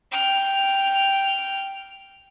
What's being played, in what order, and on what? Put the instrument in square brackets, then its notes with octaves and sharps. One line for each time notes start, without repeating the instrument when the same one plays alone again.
[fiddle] G5 F6